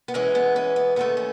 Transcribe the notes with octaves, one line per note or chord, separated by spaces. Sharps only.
B3
F#2 E3 G#3 C#4
B3
C#4
B3
D#2 D#3 A3 B3
C#4